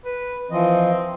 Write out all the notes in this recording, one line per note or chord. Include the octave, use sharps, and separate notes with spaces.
B4
E3 F3 C4 D#5